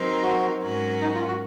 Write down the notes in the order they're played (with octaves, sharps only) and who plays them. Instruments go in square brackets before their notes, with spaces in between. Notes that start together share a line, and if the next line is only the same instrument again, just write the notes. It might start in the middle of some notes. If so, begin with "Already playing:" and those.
Already playing: [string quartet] F#3 C4 D#4 A#4
[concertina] F#4
[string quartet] G#2 F#3 C#4 F#4 A#4
[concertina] D#4
F4
F#4